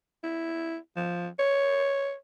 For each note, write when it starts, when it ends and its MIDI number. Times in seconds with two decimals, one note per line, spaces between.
0.24 0.77 64
0.96 1.28 53
1.39 2.14 73